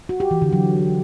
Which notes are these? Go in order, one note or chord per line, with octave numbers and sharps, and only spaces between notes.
F#4
G4
E3
D3
F#3